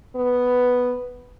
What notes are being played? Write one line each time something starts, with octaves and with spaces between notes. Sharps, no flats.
B3